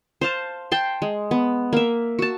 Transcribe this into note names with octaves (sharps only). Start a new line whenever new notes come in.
C5 F5 A5
G5 A5 C6
G#3
B3
A#3 E5
F#4 A5